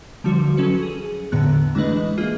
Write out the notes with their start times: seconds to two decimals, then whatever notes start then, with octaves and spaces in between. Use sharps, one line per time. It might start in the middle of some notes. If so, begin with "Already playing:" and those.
0.24 D3 F3 G3 F#4
0.57 F#3 C#4 A4 B4 C#7
0.83 G#4
1.32 E2 A2 D3 B3 A#5 F#6
1.75 E3 G#3 A3 D4 B4 D#5
2.18 A#3 F4 G#4 E5